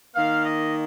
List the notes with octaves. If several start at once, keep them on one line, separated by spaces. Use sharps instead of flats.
D#3 A#3 F5
D#5